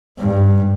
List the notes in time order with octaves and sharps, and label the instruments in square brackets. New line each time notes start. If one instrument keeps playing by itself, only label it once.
[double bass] G2